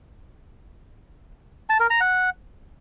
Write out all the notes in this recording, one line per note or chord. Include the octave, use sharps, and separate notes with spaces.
A5
A#4
A#5
F#5